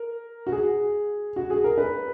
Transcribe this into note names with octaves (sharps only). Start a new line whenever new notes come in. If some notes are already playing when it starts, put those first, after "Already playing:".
Already playing: A#4
F#4
G#4
F#4
G#4
A#4
B4